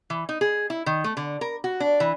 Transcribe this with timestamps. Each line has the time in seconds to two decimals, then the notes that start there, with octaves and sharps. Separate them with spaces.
0.10 E3
0.29 D#4
0.41 G#4
0.70 E4
0.86 D#3
1.04 A3
1.17 D3
1.41 A#4
1.64 F#4
1.80 D4
2.00 E3